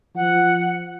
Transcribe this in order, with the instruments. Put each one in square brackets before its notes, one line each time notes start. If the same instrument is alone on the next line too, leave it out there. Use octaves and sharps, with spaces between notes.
[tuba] F3 [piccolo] F#5